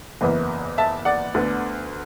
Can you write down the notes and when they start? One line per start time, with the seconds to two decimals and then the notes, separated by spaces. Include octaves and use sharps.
0.21 F#1 E2 E3 B3
0.78 E5 A5
1.05 D5 F#5
1.34 D2 D3 B3